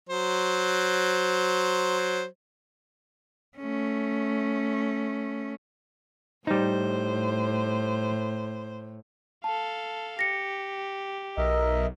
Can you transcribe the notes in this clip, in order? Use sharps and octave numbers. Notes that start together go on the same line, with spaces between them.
F#3 C5
A3 C#4
A2 G3 D#4 C5
A4 F5 A5
G4 A#6 C#7
B1 A#4 D#5 E5